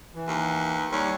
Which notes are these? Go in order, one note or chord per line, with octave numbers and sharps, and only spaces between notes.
E3
D#2
D#2 G3 C#5